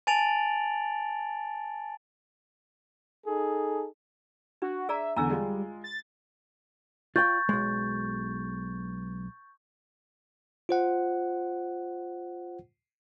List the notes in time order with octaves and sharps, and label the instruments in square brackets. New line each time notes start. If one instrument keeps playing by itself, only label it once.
[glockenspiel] G#5 A5 A6 D7 F7 F#7
[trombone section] D#4 G#4 A4
[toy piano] D4 [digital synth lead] F#4
[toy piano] G#4 D5 A#5 [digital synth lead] E5
[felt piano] E2 D3 [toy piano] A#5 E6
[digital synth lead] G3 [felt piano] G#3 F4
[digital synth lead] A6
[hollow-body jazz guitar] F4 D5 G5 [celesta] C#6 G6 A6
[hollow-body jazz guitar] B1 G#3
[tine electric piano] F4 C5 F#5